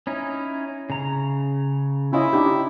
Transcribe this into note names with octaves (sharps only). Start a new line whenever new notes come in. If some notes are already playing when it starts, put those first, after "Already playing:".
C#4 D#4 E4
C#3 A#5
C#4 E4 F4 D#5
D4 D#4 G4